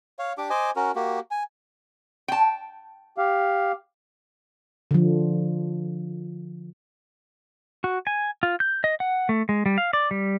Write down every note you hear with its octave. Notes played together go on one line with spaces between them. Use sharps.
C#5 F5
D4 G4 D6
C5 D#5 G#5 D6
C#4 F#4 A#4
A#3 F#4 G4
G#5
G5 A5
G4 F5
D3 F3
F#4
G#5
F4
G6
D#5
F#5
A3
G#3
G3
F5
D5
G3